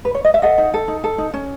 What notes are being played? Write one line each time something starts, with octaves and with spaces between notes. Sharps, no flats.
B4
C#5
D#5
E5
A4 D#5 F#5
D#4
A4
D#4
A4
D#4
C#4